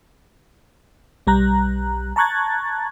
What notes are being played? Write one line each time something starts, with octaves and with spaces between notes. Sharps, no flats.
B1 G3 A#5 F#6
A5 A#5 C#6 F#6 G#6 A6